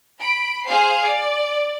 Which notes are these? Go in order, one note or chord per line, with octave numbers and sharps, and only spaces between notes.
B5 D7
G#4 C5 F5 C7
D5